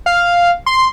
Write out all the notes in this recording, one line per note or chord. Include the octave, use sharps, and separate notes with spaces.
F5
C6